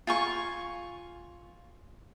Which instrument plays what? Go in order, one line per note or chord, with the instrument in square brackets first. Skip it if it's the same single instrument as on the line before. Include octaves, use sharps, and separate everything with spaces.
[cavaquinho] F4 G#5 C#6